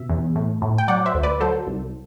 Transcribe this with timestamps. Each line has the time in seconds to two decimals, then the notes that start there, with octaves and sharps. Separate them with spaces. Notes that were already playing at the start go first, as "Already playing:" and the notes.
Already playing: B2 E5
0.09 E2
0.36 A2
0.62 A2
0.78 G5
0.88 F#3 D5 F#5
1.06 C5 E5
1.14 D2
1.23 B4 D5
1.40 F#3 A4 C5
1.67 C2